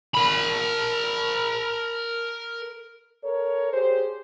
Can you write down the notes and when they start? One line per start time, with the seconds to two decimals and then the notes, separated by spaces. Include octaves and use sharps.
0.14 A#4 B5
3.23 A4 A#4 C#5
3.72 G4 G#4 C5